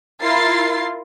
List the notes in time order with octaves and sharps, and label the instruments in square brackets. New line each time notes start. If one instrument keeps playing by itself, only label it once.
[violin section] E4 F4 A#4 A6 C7